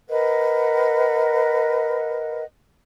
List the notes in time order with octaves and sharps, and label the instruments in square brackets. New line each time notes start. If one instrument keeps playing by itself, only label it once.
[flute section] A#4 B4 D#5 F#5